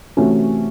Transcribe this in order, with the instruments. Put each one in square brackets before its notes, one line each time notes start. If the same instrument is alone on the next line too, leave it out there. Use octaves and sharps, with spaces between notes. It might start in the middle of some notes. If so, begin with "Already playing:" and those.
[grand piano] C3 E3 A3 C#4 F#4